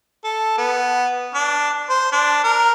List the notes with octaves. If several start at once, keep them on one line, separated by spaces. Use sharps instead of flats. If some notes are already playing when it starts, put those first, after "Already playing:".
A4
B3
D4
C5
D4
A#4